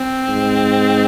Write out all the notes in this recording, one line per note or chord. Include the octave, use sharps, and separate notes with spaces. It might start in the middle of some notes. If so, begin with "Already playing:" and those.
Already playing: C4
G#2